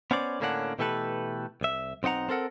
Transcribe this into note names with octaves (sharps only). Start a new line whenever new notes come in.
B3 C#4 C5 D5
A2 D3 A#3 C#4 D4 F#5
B2 E3 A3 G4 A4 B4
C2 E5
B1 C4 D#4 F#5 A#5
C4 A4 A#4 F#5